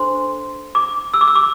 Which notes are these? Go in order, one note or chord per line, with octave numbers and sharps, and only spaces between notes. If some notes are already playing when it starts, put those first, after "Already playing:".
Already playing: D4 A4 C5 C6
D6
E6
D6
E6
D6